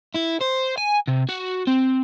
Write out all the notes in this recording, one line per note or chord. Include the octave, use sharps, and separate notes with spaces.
E4
C5
G#5
C3
F#4
C4